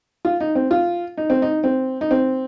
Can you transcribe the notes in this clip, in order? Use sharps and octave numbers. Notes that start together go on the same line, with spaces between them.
F4
D#4
C4
F4
D#4
C4
D#4
C4
D#4
C4